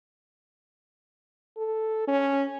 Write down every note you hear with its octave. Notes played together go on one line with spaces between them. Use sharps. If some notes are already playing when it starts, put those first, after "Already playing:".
A4
C#4